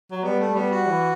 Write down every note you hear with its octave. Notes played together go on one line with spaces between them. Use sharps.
F#3
G3 B3
A3
G3 B3
F#4
E3